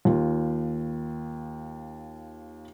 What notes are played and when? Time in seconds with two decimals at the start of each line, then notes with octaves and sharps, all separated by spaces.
0.05 D#2 F4